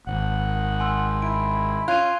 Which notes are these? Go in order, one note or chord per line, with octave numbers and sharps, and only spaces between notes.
G#1 F#5
G#5 C6 E6
E4 D7
C#4 F4 F#6 G#6 D#7